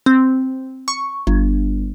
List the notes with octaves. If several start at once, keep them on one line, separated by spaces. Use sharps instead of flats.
C4
C#6
G1